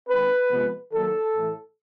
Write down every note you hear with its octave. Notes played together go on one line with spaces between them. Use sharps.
D#3 G#3 C4 B4
C3 F3 G#3 B3
D#3 F#3 A#3 A4
A2 E3 A3